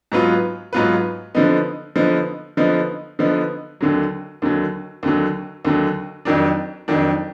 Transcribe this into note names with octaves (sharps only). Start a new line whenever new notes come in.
G#2 F#3 B3 F4 B4
G#2 F#3 B3 F4 B4
D3 F3 B3 D#4
D3 F3 B3 D#4
D3 F3 B3 D#4
D3 F3 B3 D#4
D#2 D3 F#3
D#2 D3 F#3
D#2 D3 F#3
D#2 D3 F#3
F2 D#3 F#3 D4
F2 D#3 F#3 D4